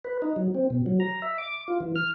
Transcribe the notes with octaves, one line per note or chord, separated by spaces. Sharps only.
B4
D#4
F#3
C4
B2
F#3
A#5
E5
D6
F4
E3
F6